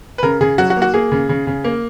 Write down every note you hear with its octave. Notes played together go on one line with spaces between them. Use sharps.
B4
C#3 A#4
C#3 G#4
F#3 F#4
F#4
A#3
F#4
A#3 G#4
C#3
C#3
C#3
A#3